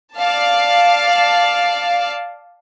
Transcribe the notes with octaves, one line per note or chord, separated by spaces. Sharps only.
D5 F5 A5